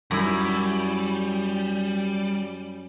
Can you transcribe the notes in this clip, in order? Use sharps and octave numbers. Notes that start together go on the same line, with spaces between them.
F#2 G3 E4